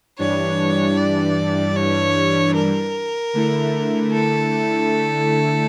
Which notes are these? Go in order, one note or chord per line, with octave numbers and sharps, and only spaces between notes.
G2 E3 G3 D4 C#5
D5
C#5
A#4
D3 A3 E4
A4